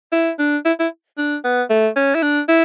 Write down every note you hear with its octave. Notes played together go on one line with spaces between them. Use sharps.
E4
D4
E4
E4
D4
B3
A3
C#4
E4
D4
E4